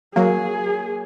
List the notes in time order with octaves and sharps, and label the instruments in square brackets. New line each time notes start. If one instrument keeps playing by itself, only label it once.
[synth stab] F#3 A#3 [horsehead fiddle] G#4